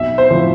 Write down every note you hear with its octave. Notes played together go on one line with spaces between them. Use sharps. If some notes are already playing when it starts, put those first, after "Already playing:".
Already playing: B1 E5
C5
A2 F3